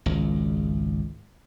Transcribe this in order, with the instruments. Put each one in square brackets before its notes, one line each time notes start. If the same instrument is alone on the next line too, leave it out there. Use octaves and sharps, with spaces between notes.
[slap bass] G#1 C#2